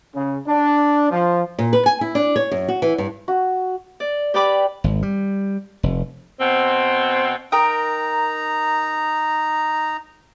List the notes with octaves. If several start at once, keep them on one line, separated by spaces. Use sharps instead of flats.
C#3
D4
F3
A#2
B4
G#5
E4
D4
C#5
F#2
F#4
E3
G2
F#4
D5
G4 B4 D5 G5 B5 D6
G#1
G3
F1
B2 C4
D#4 A#4 G5 A#5 D#6